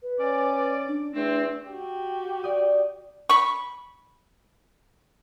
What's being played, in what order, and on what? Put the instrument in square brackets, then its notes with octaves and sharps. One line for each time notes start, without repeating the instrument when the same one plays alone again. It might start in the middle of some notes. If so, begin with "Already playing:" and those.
[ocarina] B4
[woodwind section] C#4 D5
[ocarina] D4
[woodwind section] E2 A3 C4 [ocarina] D4
[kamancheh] F#4 G4
[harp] D5 D#6 G6
[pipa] B5 C#6